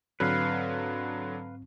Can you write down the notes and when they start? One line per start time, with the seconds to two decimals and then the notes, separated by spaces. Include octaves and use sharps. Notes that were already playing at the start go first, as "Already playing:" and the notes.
0.20 G#2 D3 F#3 C4 B4 F5